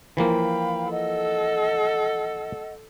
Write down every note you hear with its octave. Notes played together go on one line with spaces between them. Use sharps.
E3 F3 A#3 F5 G5 B5
A4 D#5 F#5 E6